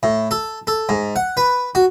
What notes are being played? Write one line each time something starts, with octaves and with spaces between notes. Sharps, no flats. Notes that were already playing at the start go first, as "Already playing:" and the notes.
A2
A4
A4
G#2
F#5
B4
F#4